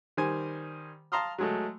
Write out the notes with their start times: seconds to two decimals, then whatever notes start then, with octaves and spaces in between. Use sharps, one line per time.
0.17 D#3 G3 C5 G#5
1.12 F5 A5 A#5 C6 D#6 F6
1.38 F#3 G#3 A3